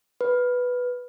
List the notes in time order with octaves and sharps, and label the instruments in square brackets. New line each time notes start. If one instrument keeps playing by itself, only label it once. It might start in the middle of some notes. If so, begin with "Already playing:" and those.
[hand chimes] B4